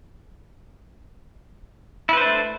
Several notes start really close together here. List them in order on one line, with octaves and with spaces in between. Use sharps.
E4 B4 C5 D4 A3